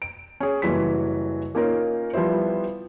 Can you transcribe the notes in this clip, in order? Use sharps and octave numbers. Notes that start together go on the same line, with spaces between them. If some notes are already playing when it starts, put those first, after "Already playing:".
D7
C#4 G#4
F#1 E3 F#3 G3 C6 B6
A#3 C#4 D#4 F4 A#4
F3 G3 B3 E4 C5